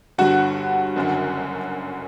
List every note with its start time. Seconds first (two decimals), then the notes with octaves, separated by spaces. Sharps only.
0.18 G1 G2 D3 F#4 F#5
0.96 F#1 F#2 D3